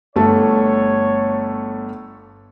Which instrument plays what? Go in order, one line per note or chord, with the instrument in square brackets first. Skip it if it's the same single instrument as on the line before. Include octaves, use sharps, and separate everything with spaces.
[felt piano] G1 A3 A4 [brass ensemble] C#5